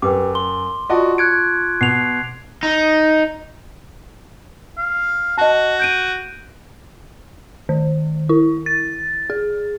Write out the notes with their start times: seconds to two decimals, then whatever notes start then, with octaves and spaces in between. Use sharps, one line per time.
0.02 F#2 G4 B4 G5 D6
0.35 C6 G7
0.90 F4 F#4 D5 D#5 A5 C#6
1.18 F#6 G#6 C#7 D7
1.81 B2 C7 F7
2.63 D#4
4.77 F5
5.38 F#4 D#5 A5
5.80 G6 D7 D#7
7.69 D#3
8.29 E4
8.66 A6
9.30 G#4